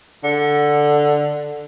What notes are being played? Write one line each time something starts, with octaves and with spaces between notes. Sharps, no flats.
D3